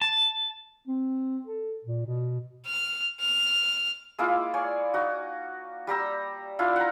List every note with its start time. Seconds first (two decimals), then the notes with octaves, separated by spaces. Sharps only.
0.02 A5
0.88 C4
1.46 A4
1.85 A#2
2.06 B2
2.66 F6
3.20 F6
4.19 G#3 A#3 E4 F4
4.54 C#5 D5 G#5
4.94 D#4 F#4
5.87 G3 G4 A#5 E6
6.59 D4 E4 F4
6.76 F#5 A#5